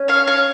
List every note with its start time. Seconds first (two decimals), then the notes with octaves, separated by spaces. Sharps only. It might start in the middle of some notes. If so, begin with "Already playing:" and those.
Already playing: C#4
0.08 C#5 F5
0.27 C#5 F5